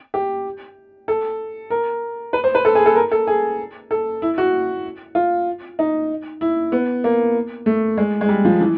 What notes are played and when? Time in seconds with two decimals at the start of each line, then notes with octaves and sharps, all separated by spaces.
0.14 G4
1.08 A4
1.70 A#4
2.33 B4
2.44 C5
2.55 B4
2.65 A4
2.75 G#4
2.86 A4
2.96 A#4
3.12 A4
3.27 G#4
3.91 A4
4.22 E4
4.38 F#4
5.15 F4
5.79 D#4
6.41 E4
6.72 B3
7.04 A#3
7.66 A3
7.97 G#3
8.21 G#3
8.29 G3
8.45 F3
8.61 E3